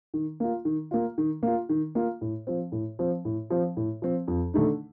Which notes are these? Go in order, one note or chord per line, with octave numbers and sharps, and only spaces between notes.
D#3
A#3 F4
D#3
A#3 F4
D#3
A#3 F4
D#3
A#3 F4
A2
F3 C4
A2
F3 C4
A2
F3 C4
A2
F3 C4
F2
D3 A3 D#4